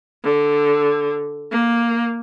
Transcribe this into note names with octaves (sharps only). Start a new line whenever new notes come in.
D3
A#3